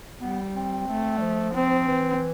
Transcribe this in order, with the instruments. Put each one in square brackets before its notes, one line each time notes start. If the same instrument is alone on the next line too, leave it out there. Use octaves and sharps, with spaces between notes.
[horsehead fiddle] G3 [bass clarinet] B3
[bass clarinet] C4
[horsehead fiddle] A3
[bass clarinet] G3
F3
[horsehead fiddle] C4
[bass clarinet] E3